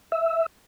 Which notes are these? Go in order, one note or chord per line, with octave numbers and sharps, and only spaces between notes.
E5